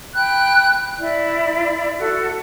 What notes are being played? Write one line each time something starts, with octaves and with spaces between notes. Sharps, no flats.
G5 B5 F#6
E4 D5
F#4 A4